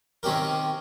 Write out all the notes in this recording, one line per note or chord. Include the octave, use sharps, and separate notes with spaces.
D#3 C4 C#4 G4 A#4